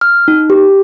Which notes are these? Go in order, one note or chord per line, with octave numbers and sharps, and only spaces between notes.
F6
D#4
G4